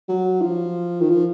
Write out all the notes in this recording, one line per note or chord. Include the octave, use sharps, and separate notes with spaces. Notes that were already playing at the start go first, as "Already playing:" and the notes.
F#3
F3
D#3
F3